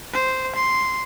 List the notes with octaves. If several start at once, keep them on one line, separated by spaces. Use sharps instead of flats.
C5
C6